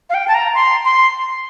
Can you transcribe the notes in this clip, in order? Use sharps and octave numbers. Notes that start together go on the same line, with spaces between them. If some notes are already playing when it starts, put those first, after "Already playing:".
F5
G5
A5
A#5
C6
C6